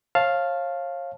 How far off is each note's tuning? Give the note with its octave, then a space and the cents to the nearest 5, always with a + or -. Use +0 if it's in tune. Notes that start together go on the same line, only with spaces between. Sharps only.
C#5 -35 F5 +0 A5 +0